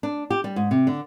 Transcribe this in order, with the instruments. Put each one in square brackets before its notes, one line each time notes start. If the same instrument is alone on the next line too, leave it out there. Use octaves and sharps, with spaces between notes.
[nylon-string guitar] D4
G4
G3
G#2
C3
D3